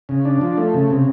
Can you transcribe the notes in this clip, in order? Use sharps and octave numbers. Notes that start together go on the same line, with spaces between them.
C#3
D4
F3
A3
C#3
C3